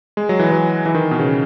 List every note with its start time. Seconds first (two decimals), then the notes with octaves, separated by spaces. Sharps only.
0.17 G#3
0.29 F#3
0.39 E3
0.52 F#3
0.86 E3
0.95 D#3
1.11 B2
1.19 C#3